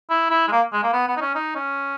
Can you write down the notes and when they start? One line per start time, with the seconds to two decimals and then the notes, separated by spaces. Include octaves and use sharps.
0.10 E4
0.31 E4
0.48 G#3
0.52 A#3
0.73 G#3
0.83 A#3
0.93 B3
1.08 B3
1.17 D#4
1.21 C#4
1.35 D#4
1.55 C#4